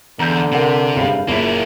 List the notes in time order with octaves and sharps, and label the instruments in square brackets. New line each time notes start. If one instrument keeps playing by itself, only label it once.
[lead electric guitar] E2 [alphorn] D3 [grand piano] A#5 G6
[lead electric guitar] C3 [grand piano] A#4 F#5
[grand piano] F#1 G2 F5
[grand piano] F#1 A#2 B6 [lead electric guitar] A#3 E4